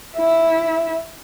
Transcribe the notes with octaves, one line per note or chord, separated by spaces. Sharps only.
E4 E5